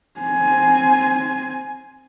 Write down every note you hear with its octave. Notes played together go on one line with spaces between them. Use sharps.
C4 G#5